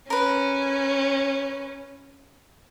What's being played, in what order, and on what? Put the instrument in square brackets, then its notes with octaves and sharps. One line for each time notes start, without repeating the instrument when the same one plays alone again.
[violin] C#4 [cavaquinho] A#4 B4